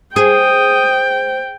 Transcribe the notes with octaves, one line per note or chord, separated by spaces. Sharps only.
G#4 C5 G5 D#6